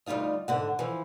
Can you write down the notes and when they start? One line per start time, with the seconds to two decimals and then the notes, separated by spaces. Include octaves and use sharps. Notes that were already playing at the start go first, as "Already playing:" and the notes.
0.06 D2 G3 D#4 F4 D#5
0.48 G#2 D3 F#5
0.79 E3 F3